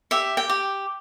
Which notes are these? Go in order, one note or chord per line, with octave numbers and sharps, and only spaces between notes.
G4 E5
G5
G4